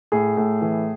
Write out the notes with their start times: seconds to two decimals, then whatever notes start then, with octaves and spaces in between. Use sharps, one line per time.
0.12 A2 G#4
0.37 A2
0.61 E3